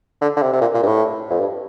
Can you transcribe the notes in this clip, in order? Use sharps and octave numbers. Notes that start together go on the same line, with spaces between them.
D3
D3
C3
C3
A#2
A#2
G2
A2
F2
G2